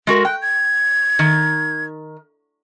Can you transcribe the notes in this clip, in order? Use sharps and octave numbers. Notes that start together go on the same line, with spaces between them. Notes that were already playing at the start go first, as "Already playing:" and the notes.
G#3 F#4 A#4
G5 F#6
G#6
D#3